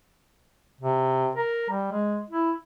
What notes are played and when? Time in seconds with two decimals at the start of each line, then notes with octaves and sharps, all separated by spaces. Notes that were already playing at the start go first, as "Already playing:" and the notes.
0.81 C3
1.36 A#4
1.70 G3
1.92 G#3
2.30 E4